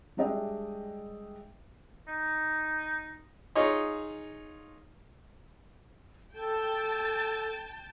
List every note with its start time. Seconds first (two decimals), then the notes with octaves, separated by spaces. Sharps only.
0.17 G3 G#3 D4 D#5 E5 G5
2.08 D#4
3.55 D#4 F4 G#4 C#5 D#5
6.35 A4 G5 A5